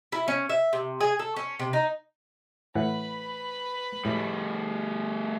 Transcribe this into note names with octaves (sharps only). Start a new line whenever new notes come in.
E4
C#4
E5
C3
G#4
A4
C#4
C3
D#4
A2 E3 B4 F#5 B5
A2 G3 A3